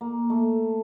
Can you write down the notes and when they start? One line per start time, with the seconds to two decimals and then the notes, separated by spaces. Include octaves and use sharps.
0.01 A#3
0.30 A3